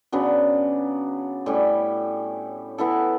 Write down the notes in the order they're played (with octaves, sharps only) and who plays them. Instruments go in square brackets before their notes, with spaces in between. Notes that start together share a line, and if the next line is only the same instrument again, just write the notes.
[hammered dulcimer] C#3 F#3 B3 D4
A2 G3 C#4 E4
E3 B3 E4 A4